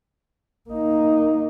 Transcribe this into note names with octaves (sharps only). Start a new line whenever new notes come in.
A#3 D#4